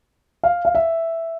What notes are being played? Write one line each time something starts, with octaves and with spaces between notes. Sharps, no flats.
F5
F5
E5